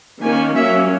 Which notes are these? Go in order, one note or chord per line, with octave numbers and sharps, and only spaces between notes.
D#3 A#3 C#4 G#5
F#3 A#3 C#4 E5